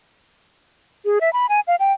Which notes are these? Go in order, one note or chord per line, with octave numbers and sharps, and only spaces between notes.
G#4
E5
B5
G#5
F5
G5